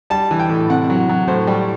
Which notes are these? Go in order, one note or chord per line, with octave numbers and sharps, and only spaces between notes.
G3 A5
E3
G5
A2
C3 F#5
F#3
F#3
A2 C5
G3